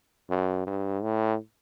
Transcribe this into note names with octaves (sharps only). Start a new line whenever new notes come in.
F#2
G2
A2